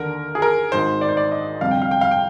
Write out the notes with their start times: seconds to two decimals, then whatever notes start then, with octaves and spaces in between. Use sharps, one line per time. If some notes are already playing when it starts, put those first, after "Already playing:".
Already playing: D#2 D3 A#4
0.35 G#4
0.42 A#4
0.72 G#1 G#2 D#3 C5
1.01 D5
1.09 C5
1.17 D5
1.32 D#5
1.61 G1 F2 C3 F5
1.71 G5
1.82 F5
1.91 G5
2.01 F5
2.11 G5